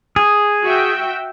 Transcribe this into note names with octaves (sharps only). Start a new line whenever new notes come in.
G#4
F#4 E5 G5